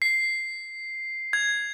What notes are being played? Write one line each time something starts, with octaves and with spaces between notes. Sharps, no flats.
C7
G#6